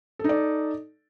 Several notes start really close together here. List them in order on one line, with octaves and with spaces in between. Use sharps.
A4 D#4 D5